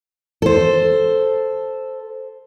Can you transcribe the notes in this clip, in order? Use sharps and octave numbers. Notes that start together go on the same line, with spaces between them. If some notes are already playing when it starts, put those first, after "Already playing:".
A4 C5